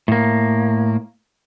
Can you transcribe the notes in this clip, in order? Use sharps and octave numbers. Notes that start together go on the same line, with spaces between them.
A2 A#3